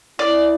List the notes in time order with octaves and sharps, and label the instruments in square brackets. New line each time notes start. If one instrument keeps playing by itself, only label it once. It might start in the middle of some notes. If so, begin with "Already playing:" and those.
[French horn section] E4 [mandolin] D5